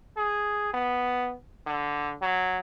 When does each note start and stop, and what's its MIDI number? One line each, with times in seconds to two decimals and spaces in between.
0.17 0.69 68
0.74 1.34 59
1.67 2.14 50
2.22 2.59 54